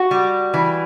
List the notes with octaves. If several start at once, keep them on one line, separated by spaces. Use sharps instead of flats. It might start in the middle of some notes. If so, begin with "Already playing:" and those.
Already playing: F#4
G3
E3